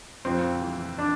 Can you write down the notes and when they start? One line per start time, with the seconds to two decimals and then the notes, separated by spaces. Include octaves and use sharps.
0.25 F2 C4
0.62 E3
0.98 D4